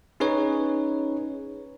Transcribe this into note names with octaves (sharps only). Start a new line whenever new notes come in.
C#4 D#4 G#4 B4 C#5